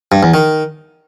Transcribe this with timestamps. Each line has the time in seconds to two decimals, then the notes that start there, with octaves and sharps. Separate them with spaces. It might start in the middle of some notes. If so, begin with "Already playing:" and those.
0.12 G2
0.23 E2
0.34 D#3